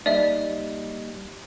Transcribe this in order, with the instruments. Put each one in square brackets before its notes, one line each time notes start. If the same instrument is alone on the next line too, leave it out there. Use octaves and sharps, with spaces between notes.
[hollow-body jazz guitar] G3 A#3 D#4 [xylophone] D5 E5